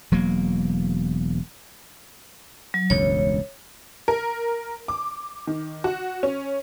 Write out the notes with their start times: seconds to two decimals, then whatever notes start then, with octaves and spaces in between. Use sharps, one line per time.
0.11 E1 F#3 A#3
2.74 F#3
2.90 E1 C#2 G2 C#5
4.08 A#4
4.88 D6
5.47 D#3
5.84 F#4
6.23 C#4